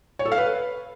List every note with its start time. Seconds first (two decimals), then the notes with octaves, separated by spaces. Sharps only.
0.19 C#5
0.25 A4
0.32 F5
0.38 B4